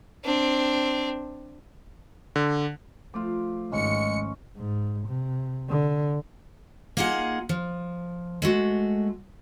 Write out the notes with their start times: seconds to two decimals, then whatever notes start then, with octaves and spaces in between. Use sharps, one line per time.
0.24 C4 D4
2.36 D3
3.14 F3 A3 F4 D6
3.72 G#1 G#3 C#4 D#4 C#7
4.56 G#2
5.07 C3
5.69 D3
6.97 A#3 D#4 F4 G#4 F#5
7.49 F3
8.42 G#3 A3 F#4